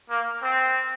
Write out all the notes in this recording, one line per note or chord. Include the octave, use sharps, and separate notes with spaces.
A#3
C4